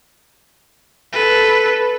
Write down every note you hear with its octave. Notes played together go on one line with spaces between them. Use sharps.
A4 B4